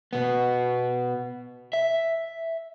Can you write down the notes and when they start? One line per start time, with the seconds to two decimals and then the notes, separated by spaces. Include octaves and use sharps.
0.13 B2 B3
1.73 E5